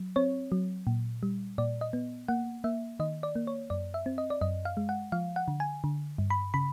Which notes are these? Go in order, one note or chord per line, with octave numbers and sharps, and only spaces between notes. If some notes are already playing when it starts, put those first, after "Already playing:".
Already playing: F#3
C4 C#5
F#3
A#2
G3
A#2 D5
D#5
B3
A#3 F#5
A#3 E5
D#3 D#5
D5
A#3
C#5
F#2 D5
E5
C4
D#5
D5
F#2 D#5
F5
G#3
F#5
F3 F5
F#5
D3
G#5
D3
G2
B5
C#3 B5